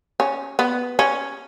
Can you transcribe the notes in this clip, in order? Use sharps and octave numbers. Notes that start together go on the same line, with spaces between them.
C#4
B3
C#4